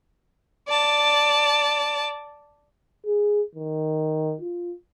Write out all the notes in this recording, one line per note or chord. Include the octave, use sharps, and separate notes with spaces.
D5 A5
G#4
D#3
F4